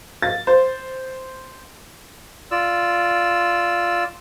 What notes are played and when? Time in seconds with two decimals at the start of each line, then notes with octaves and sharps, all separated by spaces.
0.22 A6
0.47 C5
2.51 F4 D5 E6